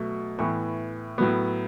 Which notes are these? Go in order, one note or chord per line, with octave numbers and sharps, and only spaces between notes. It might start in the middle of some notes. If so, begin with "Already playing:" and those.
Already playing: B2 F#3 A3
A2 E3 B3 C#6
A2 F#3 B3